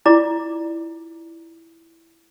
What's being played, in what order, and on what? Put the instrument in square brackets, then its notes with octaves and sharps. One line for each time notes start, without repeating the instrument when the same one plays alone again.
[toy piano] E4 F4 D5 A#5 D6